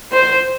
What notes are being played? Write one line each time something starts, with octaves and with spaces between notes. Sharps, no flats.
C5